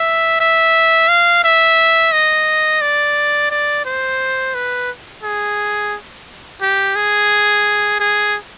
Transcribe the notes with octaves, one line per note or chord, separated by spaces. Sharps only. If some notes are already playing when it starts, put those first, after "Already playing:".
Already playing: E5
E5
F5
E5
D#5
D5
D5
C5
B4
G#4
G4
G#4
G#4